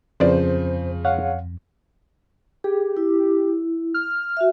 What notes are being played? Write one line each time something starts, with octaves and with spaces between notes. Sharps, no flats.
F2 C#3 F3 B4 C5 D5
C#5 F5 F#5
G4 G#4
E4
F6
F#4 E5